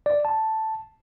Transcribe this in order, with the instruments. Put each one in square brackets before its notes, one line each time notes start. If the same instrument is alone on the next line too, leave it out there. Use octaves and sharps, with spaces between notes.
[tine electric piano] D5
A5